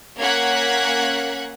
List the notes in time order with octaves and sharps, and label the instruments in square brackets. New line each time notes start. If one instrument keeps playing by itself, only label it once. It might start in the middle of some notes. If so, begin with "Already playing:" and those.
[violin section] A#3 C#4 F#5 F#6 G#6 B6